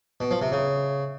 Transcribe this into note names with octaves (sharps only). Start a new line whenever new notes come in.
B2
F3
C3
C#3